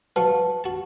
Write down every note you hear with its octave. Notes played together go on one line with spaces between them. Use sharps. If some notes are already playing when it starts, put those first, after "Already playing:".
F#3 B4 F5 A5 C#6
F#4 A5